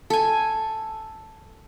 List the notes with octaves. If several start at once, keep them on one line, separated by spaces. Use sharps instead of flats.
A4 G#5